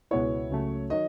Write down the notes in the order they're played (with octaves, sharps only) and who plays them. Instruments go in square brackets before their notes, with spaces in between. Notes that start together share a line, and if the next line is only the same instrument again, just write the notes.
[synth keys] C#2 B2 G#3 B3 E4 [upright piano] C#5
[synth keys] C#2 C#3 F#3 A3
[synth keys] D#3 F#3 [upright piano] D#5